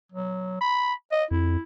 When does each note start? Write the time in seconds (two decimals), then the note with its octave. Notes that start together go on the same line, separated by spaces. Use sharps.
0.12 F#3
0.61 B5
1.12 D#5
1.31 F2 E4